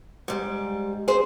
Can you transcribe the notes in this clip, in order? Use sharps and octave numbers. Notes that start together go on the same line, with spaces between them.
G#2 G3
G#4 C5